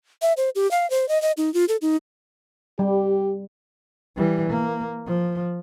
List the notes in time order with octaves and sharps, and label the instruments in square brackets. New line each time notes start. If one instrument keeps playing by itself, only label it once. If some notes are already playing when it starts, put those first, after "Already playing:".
[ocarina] E5
C5
G4
F5
C5
D#5
D#5
D#4
F4
A4
D#4
[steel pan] G3 [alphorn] G4
[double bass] E3 G3
A#3
F3